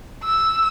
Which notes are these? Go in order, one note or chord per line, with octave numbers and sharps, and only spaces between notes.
E6